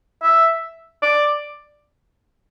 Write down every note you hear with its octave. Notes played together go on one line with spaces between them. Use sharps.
E5
D5